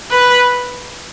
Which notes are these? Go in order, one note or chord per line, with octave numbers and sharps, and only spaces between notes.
B4